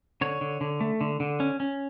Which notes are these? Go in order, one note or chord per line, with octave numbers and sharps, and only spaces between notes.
D3 C#5
D3
D3
A3
D3
D3
C#4
C#4